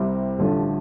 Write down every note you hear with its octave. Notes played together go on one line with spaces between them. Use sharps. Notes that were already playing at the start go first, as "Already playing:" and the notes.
Already playing: C2 C3 G3 C4 E4
A1 G2 D3 F3 A3